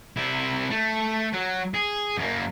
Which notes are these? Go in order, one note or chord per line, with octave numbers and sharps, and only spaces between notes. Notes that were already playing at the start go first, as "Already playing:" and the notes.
C3 E4
A3
F#3
G#4
F#2 A#3